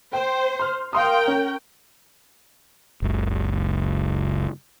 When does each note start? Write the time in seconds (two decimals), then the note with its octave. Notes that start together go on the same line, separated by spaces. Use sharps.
0.13 C5 G5
0.60 C6 F6
0.93 A#4 F5 G5 C6 D#6
1.28 C#4
3.02 F#1 C#2